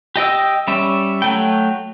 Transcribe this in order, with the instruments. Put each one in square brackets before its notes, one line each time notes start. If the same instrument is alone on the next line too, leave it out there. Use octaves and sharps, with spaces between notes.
[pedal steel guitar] G4 D#5 G5 E6
G3 C#4 E5
F#3 A3 G5